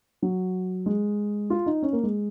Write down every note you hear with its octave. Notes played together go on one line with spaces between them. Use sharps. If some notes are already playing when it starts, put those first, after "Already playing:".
F#3
G#3
F4
D#4
C#4
A#3
G#3